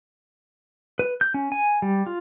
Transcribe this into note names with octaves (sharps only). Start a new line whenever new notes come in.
B4
G6
C#4
G#5
G3
F4